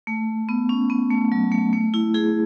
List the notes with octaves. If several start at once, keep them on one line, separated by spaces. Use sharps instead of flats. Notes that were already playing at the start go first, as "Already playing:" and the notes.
A3
B3
C#4
B3
A3
F#3
A3
A3
E4
E4 G#4